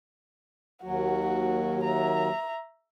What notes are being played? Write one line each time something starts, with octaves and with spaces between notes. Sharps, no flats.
D#2 F#3 F#4
E5 A#5